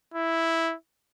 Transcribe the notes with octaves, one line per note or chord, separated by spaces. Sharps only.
E4